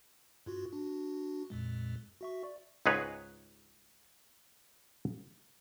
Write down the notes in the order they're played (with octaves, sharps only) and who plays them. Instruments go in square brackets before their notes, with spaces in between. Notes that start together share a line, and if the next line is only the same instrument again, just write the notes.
[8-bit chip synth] G2 F4 F#4
D4 F#4
F2 A#2 G#3
F#4 E5 C#6
D5
[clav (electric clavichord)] C#2 G#2 D#4 G#4 B4 C#5